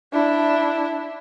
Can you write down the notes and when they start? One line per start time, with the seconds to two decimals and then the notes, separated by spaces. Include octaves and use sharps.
0.13 D4 E4